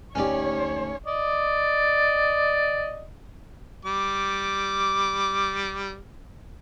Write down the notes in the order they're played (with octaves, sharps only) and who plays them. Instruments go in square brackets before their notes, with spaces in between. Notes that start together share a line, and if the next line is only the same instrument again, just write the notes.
[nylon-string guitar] D2 D#4 G4 [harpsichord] C#4 D5 [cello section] C#5
[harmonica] D5 D#5
G3 D6